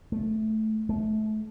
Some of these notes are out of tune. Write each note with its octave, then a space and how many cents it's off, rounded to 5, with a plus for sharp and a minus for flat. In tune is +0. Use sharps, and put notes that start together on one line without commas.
A3 -10
A3 -30